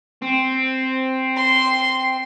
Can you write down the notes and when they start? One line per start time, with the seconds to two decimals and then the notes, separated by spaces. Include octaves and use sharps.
0.22 C4
1.36 C6